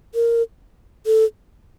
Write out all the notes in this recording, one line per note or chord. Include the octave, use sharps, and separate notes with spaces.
A#4
A4